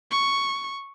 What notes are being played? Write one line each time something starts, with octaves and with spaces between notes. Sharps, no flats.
C#6